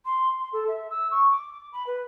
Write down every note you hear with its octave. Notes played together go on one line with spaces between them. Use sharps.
C6
C6
A4
E5
E6
C#6
D6
B5
B4